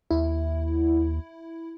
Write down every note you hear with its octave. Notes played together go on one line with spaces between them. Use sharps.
D#2 E4